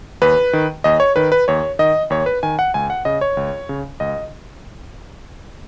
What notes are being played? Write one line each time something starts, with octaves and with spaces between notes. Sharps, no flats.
D#2 B4
D#3
D#2 D#5
C#5
D#3 B4
B4
D#2 C#5
D#3 D#5
D#2 C#5
B4
D#3 G#5
F#5
C#2 G#5
F#5
C#3 D#5
C#5
C#2
C#3
C#2 D#5